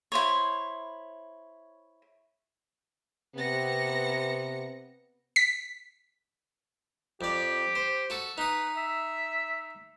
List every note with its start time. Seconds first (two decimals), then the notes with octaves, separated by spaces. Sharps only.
0.12 E4 C5 C#5
3.36 C3 B3 A#6 C#7
5.36 B6
7.21 F2 G4 D5
7.76 C5
8.10 F#4 A4
8.38 D#4 B4 D#6
8.77 E5